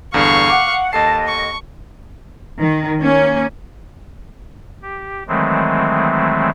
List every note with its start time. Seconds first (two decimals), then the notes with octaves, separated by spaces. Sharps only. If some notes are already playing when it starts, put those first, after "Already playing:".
0.14 E2 G2 D3 F5 C#6
0.50 F#5 D6
0.93 D#2 A4 D#5 A5 C7
1.27 C#6
2.60 D#3
3.01 A#3 C#4
4.82 G4
5.28 D#3 E3 F#3 G#3 A3 C4